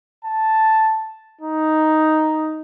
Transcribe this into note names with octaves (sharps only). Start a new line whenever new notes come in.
A5
D#4